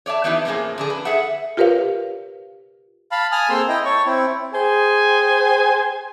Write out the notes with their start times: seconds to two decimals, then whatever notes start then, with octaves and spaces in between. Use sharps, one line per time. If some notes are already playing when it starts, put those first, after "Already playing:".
0.06 C#5 D5 E5 A5
0.24 E3 F3 B3 D#4 E4 G4
0.45 A2 F3 A#3 C#4 F4 G#4
0.78 D3 D4 G#4
0.90 B4
1.05 G#4 A4 E5 F#5
1.57 F4 G4 A#4 B4 C#5 F5
3.12 F5 A5 B5
3.32 G#5 A5 D#6 F6
3.49 A#3 C4 G#4 A4 C6 E6
3.68 E4 D#5 G5
3.85 C#5 A5 C#6
4.06 C4 E4
4.53 G#4 C5 G5 G#5